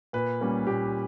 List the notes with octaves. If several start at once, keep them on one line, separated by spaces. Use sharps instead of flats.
A#2 B4
G3 A#3 C#4
A#2 G4